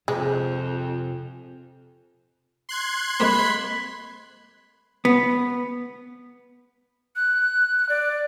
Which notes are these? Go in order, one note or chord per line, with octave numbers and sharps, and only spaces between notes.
F2 C3 G#3 C#5 G#5
C6 F#6 G#6
G#3 A#3 C4 B5
B3
F#6
D5